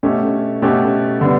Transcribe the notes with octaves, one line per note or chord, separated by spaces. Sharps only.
B2 A3 C#4 G4
B2 A3 C#4 G4
D3 G3 B3